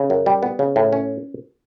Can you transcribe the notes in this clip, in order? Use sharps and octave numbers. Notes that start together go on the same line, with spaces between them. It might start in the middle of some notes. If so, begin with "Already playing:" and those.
Already playing: C#3
F#2
G3
B3
C#3
A2
C#4